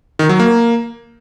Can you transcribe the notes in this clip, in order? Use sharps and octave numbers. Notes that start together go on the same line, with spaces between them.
D#3
F#3
A#3